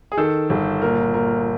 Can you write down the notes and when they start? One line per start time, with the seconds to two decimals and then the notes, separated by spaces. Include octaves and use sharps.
0.12 G#4
0.17 D#3 A4
0.50 G1
0.82 A#2 A#4
1.14 A#2 A#4